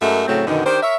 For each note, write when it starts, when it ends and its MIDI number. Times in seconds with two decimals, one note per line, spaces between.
0.01 0.24 42
0.01 0.24 56
0.01 0.24 57
0.01 0.24 70
0.01 0.24 76
0.27 0.43 45
0.27 0.43 49
0.27 0.43 54
0.27 0.43 57
0.27 0.43 60
0.47 0.64 42
0.47 0.64 47
0.47 0.64 50
0.47 0.64 51
0.47 0.64 63
0.65 0.80 51
0.65 0.80 62
0.65 0.80 67
0.65 0.80 72
0.82 0.96 70
0.82 0.96 73
0.82 0.96 76